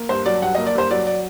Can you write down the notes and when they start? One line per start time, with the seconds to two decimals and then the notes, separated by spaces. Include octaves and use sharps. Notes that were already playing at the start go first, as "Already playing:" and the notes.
Already playing: A#3
0.09 G2 C5
0.26 F#3 D5
0.42 G2 F#5
0.55 A#3 D#5
0.66 D5
0.75 G2 C5
0.91 F#3 D5
1.07 D5